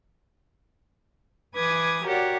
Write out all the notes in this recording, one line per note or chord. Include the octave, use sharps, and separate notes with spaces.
E3 B4 G#5 D6 D#6 G#6
F#4 G4 A#4 C#5 D5 F#5